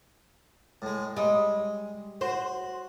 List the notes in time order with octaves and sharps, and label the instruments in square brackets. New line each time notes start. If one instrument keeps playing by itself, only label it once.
[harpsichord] A2 G#3
[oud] G3 D#5 [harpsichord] G#3
[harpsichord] F#4 [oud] C5